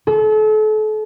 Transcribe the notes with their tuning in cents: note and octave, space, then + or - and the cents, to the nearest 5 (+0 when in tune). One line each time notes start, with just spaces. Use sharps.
A4 -35